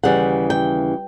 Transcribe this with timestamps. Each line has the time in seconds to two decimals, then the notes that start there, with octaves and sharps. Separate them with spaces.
0.03 D#2 C#3 E3 G3 F#5
0.50 G5